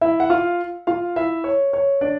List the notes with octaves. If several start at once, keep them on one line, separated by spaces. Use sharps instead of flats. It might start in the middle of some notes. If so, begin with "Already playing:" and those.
E4 E5
F#5
F4 F5
F4 F5
E4 E5
C#5
C#5
D4 D5